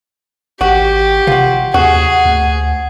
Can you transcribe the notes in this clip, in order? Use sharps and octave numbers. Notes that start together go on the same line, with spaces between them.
G#1 F#4 G4
C3 F4 F#4
D#2 F#4 G#4 F#5
D2